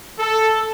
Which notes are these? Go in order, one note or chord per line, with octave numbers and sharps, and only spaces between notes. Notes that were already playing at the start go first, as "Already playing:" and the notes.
A4